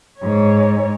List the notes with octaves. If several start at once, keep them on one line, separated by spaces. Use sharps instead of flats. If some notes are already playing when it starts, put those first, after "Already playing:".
G#2 C#5